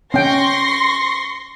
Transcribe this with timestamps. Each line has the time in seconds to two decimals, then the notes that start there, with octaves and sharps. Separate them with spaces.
0.14 C#4 G5 C6 C#6 A#6